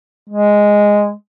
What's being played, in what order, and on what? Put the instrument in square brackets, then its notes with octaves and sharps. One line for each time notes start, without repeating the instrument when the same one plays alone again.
[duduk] G#3